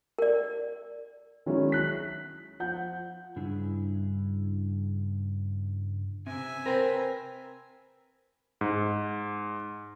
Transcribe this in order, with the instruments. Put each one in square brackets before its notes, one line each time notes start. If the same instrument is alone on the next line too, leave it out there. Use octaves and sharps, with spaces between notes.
[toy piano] A#4 D5
[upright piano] D#3 F#3 G#3 C#4 D4 E4
F#6 B6
F3 F#5 G6
[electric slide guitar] G2 C#3 D4 E4 G#4
[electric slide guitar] C3 [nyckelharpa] E5 G#5
[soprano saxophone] C4 [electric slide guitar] A#4 B4
[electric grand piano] G#2